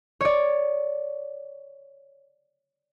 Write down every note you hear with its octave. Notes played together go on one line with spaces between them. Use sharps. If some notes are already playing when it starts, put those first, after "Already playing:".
C#5 D5